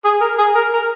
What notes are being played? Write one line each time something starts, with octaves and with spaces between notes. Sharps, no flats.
G#4
A#4
G#4
A#4
A#4